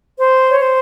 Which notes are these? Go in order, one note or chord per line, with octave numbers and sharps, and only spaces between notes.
C5
C#5
C5